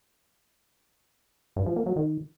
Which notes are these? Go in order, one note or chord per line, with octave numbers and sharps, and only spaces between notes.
G2
F3
A#3
F#3
D#3